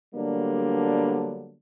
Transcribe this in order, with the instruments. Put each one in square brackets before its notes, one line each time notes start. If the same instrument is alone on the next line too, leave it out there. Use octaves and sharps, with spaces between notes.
[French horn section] D3 F#3 G3 A#3 B3 D4